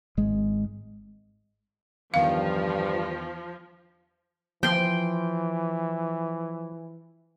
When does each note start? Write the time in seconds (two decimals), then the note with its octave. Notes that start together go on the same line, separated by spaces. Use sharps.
0.17 G#1 G#3
2.14 E2 G2 D#3 F3 F5
4.63 E3 F3 G5 C6